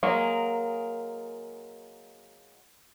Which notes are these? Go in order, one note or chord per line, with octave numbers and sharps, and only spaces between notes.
F#3 G#3 A#3